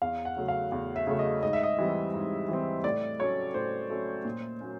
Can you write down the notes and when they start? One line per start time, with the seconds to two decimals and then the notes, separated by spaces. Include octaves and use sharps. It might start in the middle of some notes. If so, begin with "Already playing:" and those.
0.02 E2 F5
0.25 F#5
0.36 C#3 F#3 A3
0.48 F5
0.72 E2
0.96 E5
1.07 C#3 F#3 A3
1.19 D#5
1.43 G#2 D#5
1.53 E5
1.63 D#5
1.78 E3 G3 C4
2.14 G#2
2.48 E3 G3 C4
2.84 A2 D5
3.19 F#3 A3 C#4 C#5
3.54 A2 C5
3.90 F#3 A3 C#4
4.25 A#2
4.61 F#3 A#3 C#4